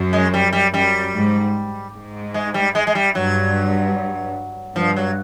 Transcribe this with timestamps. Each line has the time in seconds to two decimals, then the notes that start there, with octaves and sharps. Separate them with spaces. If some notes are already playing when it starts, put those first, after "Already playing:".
Already playing: F#2
0.13 G#3
0.34 G3
0.53 G3
0.73 F#2 G3
1.14 G#2
1.94 G#2
2.34 G#3
2.54 G3
2.75 G#3
2.87 G#3
2.95 G3
3.15 G2 F#3
4.76 G2 F3
4.96 F#3